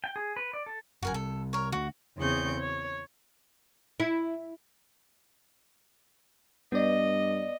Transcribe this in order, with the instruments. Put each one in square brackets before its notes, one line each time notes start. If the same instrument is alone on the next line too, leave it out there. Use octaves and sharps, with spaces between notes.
[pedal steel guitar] G5
G#4
B4
D5
A4
[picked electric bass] G1 F#2 [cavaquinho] F#4 A#4 G#5
[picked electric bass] C3 G3 [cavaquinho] A4
[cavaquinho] A#4 C#5
[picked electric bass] D3 A3 D4 [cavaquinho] F#4
[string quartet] E2 C#3 C4 G#4 C#6 G6
C#5
[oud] E4
[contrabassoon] G2 [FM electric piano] B3 D5 [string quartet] D#5